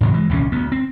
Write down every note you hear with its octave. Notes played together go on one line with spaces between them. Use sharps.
G#2 C3 E3 F#3
E3 G#3
D#1 C2 C3 C#4
D2 B3
C4